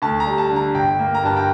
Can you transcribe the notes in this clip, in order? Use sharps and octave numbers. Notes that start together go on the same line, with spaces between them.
D2 A5
A#5
G3
A5
D3
A#5
G1 G5
A#3
A#5
G2 A5
G5